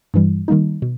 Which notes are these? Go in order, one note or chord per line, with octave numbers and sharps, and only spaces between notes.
G2 E3 G3
D#3 G3 A#3 D#4
B2